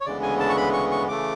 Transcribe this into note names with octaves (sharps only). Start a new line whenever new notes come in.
C#5
D2 C#3 E3 G#3 B3 D5
G#5
A5
C#6
B5
C#6
C#6
C#3 E3 A3 D6